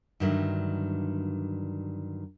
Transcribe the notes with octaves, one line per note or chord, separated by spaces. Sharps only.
G2 D3 D#3 F#3 G#3 A3